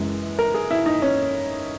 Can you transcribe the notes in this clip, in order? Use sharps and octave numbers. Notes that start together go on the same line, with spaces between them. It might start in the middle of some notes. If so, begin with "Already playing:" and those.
Already playing: F#1 F#2 E3 G#3
A#4
G#4
E4
D#4
C#4